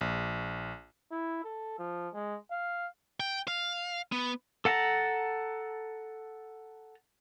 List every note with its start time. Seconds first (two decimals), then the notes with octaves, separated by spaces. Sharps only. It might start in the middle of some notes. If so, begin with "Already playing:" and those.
0.01 A#1
1.11 E4
1.44 A4
1.79 F3
2.14 G#3
2.51 F5
3.20 G5
3.48 F5
4.12 B3
4.65 A4 F#5 A5 A#5